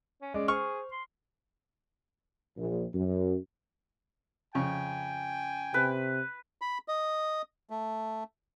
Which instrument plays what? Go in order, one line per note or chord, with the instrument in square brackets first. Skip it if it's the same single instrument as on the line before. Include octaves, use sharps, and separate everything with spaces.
[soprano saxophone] C#4
[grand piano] G#3 C#4 [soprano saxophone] D5
[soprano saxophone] G#4 [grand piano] C5 F6 [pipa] C#6
[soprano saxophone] C6
[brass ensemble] A#1
F#2
[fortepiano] F2 C#3 C#6 [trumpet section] G5 G#5
[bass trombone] C3 [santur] B4
[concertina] B5
D#5
A3